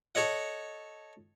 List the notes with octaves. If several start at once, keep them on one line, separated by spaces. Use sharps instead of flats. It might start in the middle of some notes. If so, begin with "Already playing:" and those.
A4 C#5 D#5 F#5